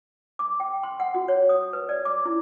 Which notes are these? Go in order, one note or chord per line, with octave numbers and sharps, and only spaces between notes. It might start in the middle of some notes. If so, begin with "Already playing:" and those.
D6
G5
C6
F#5
F#4
C#5
D#6
B4
D5
D6
E4